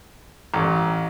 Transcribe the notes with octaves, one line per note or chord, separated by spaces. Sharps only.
A1